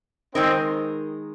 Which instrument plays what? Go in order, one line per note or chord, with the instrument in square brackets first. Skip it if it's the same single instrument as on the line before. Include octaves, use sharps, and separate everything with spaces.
[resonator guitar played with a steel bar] D#3 G#3 D#4 A#4 [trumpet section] C4